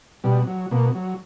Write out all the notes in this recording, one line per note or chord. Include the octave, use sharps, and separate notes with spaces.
B2 G3
F#3
B2 A#3
F#3